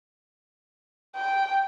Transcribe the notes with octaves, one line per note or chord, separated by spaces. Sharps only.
G5